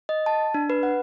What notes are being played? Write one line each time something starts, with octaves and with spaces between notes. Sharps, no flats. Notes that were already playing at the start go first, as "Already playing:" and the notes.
D#5
A5
D4
B4
F#5